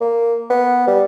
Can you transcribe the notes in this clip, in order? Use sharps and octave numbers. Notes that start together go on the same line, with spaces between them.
A#3
B3
G3